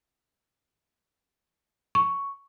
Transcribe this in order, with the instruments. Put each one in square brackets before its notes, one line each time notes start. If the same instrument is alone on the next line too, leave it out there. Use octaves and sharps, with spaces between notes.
[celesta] C#6